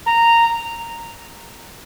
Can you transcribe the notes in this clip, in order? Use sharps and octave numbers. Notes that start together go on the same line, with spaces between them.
A#5